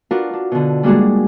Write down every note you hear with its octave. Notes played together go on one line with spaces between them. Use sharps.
D4 F4 F#4 A#4 B4
D4
B2 D3
G3 G#3 A#3 D4 F#4 G#4